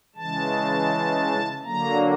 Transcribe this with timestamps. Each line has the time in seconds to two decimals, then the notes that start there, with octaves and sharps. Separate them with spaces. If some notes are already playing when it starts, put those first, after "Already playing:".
0.15 C#3 E3 G#3 A5
1.63 D3 F#3 A#3 A#5